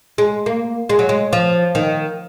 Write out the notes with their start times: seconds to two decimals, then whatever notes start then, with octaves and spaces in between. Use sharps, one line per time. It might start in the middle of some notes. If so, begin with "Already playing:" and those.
0.18 G#3
0.46 A#3
0.89 G#3
0.99 F#3
1.09 G#3
1.33 F3
1.75 D#3